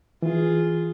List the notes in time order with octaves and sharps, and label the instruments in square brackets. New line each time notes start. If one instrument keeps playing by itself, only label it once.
[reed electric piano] E3 [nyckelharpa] F4 G#4